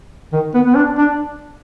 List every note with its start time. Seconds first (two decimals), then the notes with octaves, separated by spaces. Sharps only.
0.32 D#3
0.54 B3
0.67 B3
0.75 D4
0.98 D4